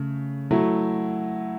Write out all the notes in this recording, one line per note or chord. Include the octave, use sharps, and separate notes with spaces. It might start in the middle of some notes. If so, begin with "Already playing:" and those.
Already playing: C#3 A3
F#3 A3 E4